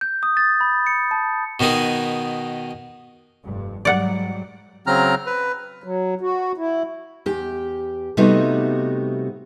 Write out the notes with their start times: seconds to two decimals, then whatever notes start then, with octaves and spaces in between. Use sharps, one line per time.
0.01 G6
0.23 D#6
0.37 A6
0.61 B5
0.87 C#7
1.11 A5
1.60 B2 D#3 B3 D#4 G#4
3.43 F1 G2
3.85 G#2 F#3 G3 D5 F#5
4.87 C#3 F#3 C4 A#5 F6
5.26 B4
5.84 F#3
6.21 F#4
6.57 E4
7.26 E2 G4
8.17 C3 G3 A3 B3 D#4 F#4